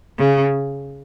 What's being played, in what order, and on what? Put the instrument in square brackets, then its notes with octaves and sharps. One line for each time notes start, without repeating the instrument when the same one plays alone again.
[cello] C#3